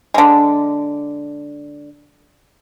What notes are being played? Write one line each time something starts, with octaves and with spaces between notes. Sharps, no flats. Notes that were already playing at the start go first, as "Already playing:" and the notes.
D3 G#3